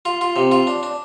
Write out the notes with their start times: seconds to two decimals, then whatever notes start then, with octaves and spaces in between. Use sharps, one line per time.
0.05 F4
0.21 F4
0.36 C3
0.51 F4
0.67 D4
0.83 D4